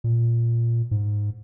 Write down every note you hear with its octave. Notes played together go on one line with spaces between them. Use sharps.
A#2
G#2